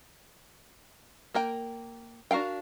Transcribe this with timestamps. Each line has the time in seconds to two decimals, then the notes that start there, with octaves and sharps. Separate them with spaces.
1.34 A#3 A#4 G5
2.31 D4 F#4 A#4 F5 G5